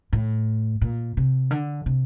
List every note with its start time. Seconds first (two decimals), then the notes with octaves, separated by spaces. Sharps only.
0.13 A2
0.81 A#2
1.17 C3
1.51 D3
1.86 C3